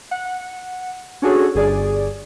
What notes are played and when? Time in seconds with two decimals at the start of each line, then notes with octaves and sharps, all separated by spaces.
0.11 F#5
1.22 C#4 D4 F#4 G#4 A4 C#5
1.55 G1 G#4 D5